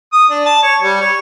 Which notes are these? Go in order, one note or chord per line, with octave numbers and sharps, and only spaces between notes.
D#6
D4
A5
C#5
G3
C#5